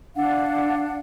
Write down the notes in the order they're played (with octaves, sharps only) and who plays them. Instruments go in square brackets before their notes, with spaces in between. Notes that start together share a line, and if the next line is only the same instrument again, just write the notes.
[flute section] D4 F5 F#5